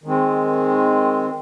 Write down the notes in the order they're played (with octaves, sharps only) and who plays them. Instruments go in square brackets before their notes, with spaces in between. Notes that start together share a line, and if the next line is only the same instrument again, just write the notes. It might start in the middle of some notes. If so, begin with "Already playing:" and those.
[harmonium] D#3 G#3 C4